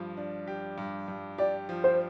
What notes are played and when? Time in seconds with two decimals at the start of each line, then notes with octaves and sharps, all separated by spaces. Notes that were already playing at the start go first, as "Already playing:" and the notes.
Already playing: G2 F3
0.17 D4
0.47 G4
0.78 G2
1.08 G2
1.38 G4 D5
1.69 F3
1.84 C5